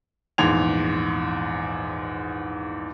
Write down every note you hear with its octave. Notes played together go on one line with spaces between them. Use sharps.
A#1 E2 G#2 C6 G#6 F7